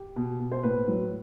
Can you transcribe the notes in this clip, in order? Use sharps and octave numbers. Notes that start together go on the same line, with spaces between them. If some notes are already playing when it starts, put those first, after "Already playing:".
Already playing: G4
B2
B2
C5
A2 B4
F#3